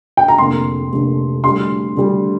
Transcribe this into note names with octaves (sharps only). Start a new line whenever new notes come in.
G5
A#5
F1 F2 D3 A#3 C6
F1 F2 D3 A#3
D2 D3 G3 C6
D2 D3 G3